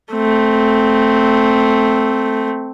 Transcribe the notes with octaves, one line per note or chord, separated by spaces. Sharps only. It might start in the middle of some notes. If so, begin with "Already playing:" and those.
A3 C4